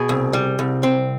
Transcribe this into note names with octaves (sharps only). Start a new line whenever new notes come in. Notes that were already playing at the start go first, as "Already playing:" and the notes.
Already playing: B2 G#4
C2
G3
C2
C4